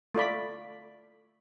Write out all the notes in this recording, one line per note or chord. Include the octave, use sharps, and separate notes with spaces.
A3 F4 D5 B5